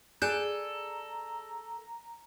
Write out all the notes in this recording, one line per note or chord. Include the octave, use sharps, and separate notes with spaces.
G#4 A4 D5 A#5 F#6 G6